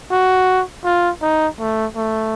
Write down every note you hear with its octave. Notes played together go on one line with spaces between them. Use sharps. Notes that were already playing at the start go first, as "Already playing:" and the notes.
F#4
F4
D#4
A3
A3